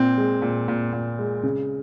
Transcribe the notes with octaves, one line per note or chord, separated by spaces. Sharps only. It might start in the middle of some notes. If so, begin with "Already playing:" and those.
Already playing: A#2 C4
G#3
A#2
A#2
A#2
G#3
C#3